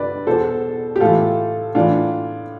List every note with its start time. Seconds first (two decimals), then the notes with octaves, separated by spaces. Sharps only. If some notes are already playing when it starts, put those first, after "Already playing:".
Already playing: G2 D3 B4 D5
0.27 E2 B2 A4 C5
0.96 G4
1.01 A2 E3 F4 A4
1.75 A2 E3 D4 F4